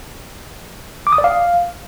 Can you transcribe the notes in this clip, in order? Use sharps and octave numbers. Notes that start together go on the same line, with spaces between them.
D6
D#6
D5
F5